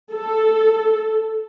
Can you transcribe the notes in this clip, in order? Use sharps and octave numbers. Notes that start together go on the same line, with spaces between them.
A4